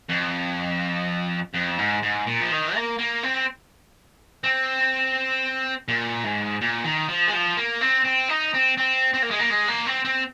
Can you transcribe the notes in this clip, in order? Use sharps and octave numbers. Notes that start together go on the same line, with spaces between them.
F2
F2
G#2
G#2
A#2
F3
D#3
A#3
A#3
C4
C4
A#2
G#2
A#2
D#3
F3
G#3
F3
A#3
C4
C4
D#4
C4
C4
C4
A#3
G#3
A#3
G#3
A#3
C4
C4